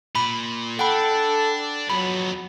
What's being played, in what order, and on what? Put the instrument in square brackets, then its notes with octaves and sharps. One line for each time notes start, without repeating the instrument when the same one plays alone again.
[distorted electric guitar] A#2 [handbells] B5
[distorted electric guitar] D4 [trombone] A4 [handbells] F#5 G5 B5
[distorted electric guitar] F2 B3 [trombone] F#3 [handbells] B5